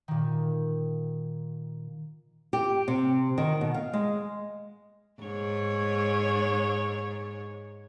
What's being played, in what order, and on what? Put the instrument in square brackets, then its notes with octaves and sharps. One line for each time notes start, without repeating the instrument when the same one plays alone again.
[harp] A#2 D#3
[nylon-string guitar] G4
C3
D#3
B2
F5
G#3
[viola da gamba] G#2 C#5